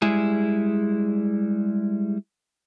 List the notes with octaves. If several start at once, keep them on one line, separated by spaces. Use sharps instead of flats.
G3 G#3 E4 G#4